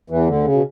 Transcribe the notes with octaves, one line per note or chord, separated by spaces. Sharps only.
E2 E3
D2 D3
C#3
B2